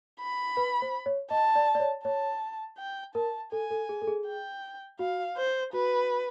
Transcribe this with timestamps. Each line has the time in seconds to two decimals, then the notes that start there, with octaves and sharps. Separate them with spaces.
0.20 B5
0.57 B4
0.82 C5
1.06 C#5
1.31 D#5 A5
1.55 D5
1.75 D5
1.80 C#5
2.04 C#5 A5
2.78 G5
3.15 A#4 A5
3.52 A4 G#5
3.71 A4
3.89 G#4
4.02 A4
4.07 G#4
4.26 G5
4.99 F#4 F5
5.37 C5
5.73 F#4 B4